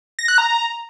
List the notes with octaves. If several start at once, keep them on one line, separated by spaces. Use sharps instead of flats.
A#6
F#6
A#5